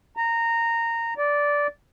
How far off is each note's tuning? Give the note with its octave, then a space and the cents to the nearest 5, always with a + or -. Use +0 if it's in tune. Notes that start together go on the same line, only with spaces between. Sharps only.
A#5 -15
D5 -10